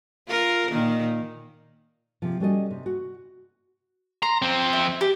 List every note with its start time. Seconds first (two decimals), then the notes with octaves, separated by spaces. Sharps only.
0.28 F4 A#4
0.70 A#2 D#3 A#3
2.22 C3 F3
2.40 G3 C#4 F#4 A4 C#5 D#5
2.71 C3
2.86 F#4
4.22 A#5 C6
4.42 F2 C4
4.73 E5
5.01 G4